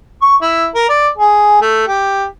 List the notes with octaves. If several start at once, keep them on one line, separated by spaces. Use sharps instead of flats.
C#6
E4
A#4
D5
G#4
A3
G4